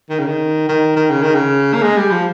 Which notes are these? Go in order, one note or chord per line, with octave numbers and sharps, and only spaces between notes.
D#3
C#3
D#3
D#3
D#3
C#3
D#3
C#3
A#3
G#3
G3
F3